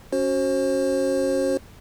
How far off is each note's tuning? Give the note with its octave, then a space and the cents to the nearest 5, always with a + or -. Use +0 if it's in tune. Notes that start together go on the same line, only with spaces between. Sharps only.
C#4 +0 F#4 +5 C5 +35